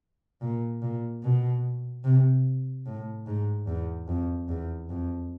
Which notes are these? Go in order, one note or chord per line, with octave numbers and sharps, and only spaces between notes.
A#2
A#2
B2
C3
A2
G#2
E2
F2
E2
F2